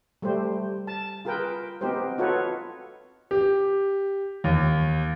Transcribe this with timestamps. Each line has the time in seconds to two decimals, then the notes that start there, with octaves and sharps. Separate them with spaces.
0.22 G3 A3 G4 C5
0.87 A5
1.25 F4 G#4 A#4 B4 G5
1.81 B3 C4 D#4 G4 A#4 C5
2.18 D#4 F4 F#4 A4 B4 C#5
3.31 G4
4.44 D#2